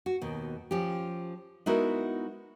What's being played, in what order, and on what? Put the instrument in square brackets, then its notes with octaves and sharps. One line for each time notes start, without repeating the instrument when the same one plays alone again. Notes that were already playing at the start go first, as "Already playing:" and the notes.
[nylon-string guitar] F#4
D#2 B2
F3 C#4 G4
G#3 B3 D#4 E4 F#4 A#4